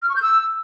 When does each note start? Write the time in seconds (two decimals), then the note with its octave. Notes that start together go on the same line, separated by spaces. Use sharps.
0.03 F6
0.09 C#6
0.16 G6
0.22 E6